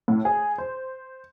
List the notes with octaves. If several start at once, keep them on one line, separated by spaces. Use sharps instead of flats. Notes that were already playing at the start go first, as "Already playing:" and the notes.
A2
G#4
C5